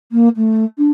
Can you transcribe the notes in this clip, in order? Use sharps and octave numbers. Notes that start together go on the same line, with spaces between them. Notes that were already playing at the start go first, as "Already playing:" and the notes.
A#3
A3
D4